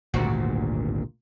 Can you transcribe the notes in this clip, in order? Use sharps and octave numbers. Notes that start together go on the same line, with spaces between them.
G#1 D2 G2 A#2 C4 F#4